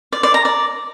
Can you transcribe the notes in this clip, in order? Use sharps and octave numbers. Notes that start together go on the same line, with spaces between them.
D5
D5
A#5
D5